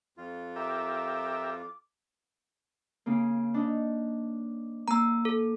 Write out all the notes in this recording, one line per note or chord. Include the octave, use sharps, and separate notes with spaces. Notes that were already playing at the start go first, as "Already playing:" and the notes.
F2 F4
G4 A#4 E5 D6
C#3 A#3
D4 D#4
A#3 A#5 E6
A4